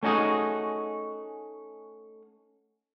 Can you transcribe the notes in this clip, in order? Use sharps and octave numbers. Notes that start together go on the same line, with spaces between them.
A3 C#4 D#4 F#4 G#4